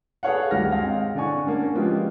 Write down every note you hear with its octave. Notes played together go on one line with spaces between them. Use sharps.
G#4 A4 B4 C#5 F5 F#5
D2 G2 D#3 G4 F6 A#6
G#3 C4 F5 G5 A#6
D3 D5 F#5 G#5 C#6
A#3 C#4 D4
F3 G#3 B3 C#4 F4 G4